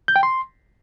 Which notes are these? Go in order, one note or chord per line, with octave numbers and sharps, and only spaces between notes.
G6
G5
C6